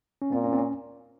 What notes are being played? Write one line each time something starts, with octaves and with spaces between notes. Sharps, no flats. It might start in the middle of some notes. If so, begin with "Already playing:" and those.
C#4
A#2 C4
C#4
C4
C#4